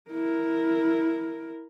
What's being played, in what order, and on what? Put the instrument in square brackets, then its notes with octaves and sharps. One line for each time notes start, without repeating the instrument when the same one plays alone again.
[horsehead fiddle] E4 A#4